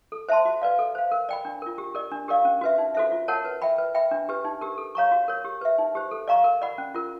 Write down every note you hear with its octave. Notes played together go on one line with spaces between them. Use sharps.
A4
C5 E5 A5 C6
F#4
B4 D5 F5
A4
C5 F5
A#4
D5 G5 B5
D4
F4 A#4
G4
A#4 D5
D4
G4 A#4 D5 F5
C#4
F#4 B4 E5
D#4
F#4 A4 C5 E5
F4
A#4 C#5 F#5 A5
B4
E5 G5 B5
B4
E5 G5 B5
D4
G4 B4
D#4
G4 A#4
A4
C#5 F5 A#5 C#6
F#4
A#4 C#5
G4
B4 E5
D#4
G4 C5
A4
D5 F5 A#5 C#6
A#4
D5 F#5 B5
C#4
F4 A#4